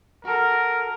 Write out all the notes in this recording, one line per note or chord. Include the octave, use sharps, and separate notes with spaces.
F#4 A4 A#4